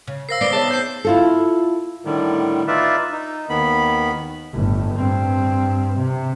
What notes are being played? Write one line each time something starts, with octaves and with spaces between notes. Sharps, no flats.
C#3
A#4 C5 F5 E6 A#6 C7
B3 C4 D#4 D5 C7 G7
G#4 C#5 E5 A5
C5 G6 C7
E4 F4 A4
A2 D3 D#3 G3
D#4 F4 B4 D5 E5
D#4
D#2 D#3 B3 B5
G1 A2
G2 C4
C3